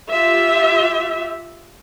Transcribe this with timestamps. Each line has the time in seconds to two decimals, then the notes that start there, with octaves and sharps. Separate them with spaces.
0.11 F4 G4 E5